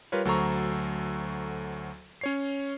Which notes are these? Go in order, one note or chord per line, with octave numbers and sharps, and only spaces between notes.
G3 F4 A#4 B4 C#5
D2 F#3 A4 C5 A#5 C#6
C#4 C#5 C7